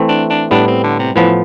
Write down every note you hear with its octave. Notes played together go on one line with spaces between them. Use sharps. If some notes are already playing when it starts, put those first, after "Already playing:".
Already playing: E3 A3 C4
D4
D4
A2 G3 B3 D4
C4
D3
C3
A2 E3 F3 B3